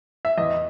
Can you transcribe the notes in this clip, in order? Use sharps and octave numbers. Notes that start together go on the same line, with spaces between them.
E5
E2 D#5